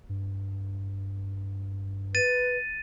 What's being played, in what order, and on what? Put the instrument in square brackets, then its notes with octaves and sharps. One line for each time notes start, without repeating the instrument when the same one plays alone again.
[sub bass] G2
[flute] B4 [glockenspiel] A6 D#7